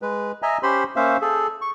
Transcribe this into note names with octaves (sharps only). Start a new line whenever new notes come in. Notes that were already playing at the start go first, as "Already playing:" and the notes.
G#3 B4
D#5 E5 G#5 A#5
C#4 G4 C5 B5 C6
A#3 C#4 C5 E5 F5
G#4 A4
C#6